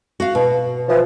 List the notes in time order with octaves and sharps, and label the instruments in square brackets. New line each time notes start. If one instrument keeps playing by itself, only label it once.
[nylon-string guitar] F#4 F5
B2
[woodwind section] E3 F3